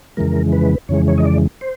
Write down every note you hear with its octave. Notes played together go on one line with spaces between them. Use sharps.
F2 C#3 E3 G#3 A#4
B4
F2 C#3 E3 G#3 C#5
C#5
D#5
D5
C5